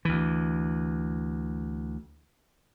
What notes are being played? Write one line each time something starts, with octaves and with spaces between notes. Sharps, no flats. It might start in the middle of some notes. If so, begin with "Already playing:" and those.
D2 E3